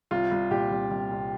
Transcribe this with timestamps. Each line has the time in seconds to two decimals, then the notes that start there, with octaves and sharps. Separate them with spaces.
0.11 C2 F4
0.31 C2
0.51 A#2 G4
0.71 C2
0.91 C2
1.11 C2